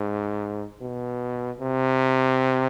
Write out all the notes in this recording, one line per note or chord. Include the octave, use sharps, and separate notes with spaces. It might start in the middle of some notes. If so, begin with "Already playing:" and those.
Already playing: G#2
B2
C3